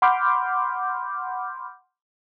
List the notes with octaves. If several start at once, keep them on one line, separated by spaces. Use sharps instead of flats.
F#5 B5 C6 D6 F6 G6